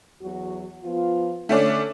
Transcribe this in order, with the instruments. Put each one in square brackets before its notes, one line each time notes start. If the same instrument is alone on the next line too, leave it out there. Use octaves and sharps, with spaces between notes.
[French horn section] E2 F#3 F#4
F3 B3 F4
[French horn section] D3 [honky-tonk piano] A3 C#4 D4